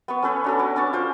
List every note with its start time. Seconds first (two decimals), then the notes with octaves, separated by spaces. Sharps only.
0.08 B3 B4 C#6
0.23 C#4 A4 B4 C#5
0.44 D4 F#4 A4
0.59 C#5 G#5 D6
0.76 C#4 D4 A5 C#6
0.93 F4 C5 D5